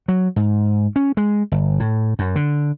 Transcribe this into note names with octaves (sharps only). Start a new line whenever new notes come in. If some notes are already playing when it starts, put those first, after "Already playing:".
F#3
G#2
C#4
G#3
G1
A2
F#2
D3